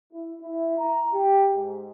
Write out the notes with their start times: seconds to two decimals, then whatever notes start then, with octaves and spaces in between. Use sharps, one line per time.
0.11 E4
0.41 E4
0.77 A#5
1.13 G4
1.54 G#2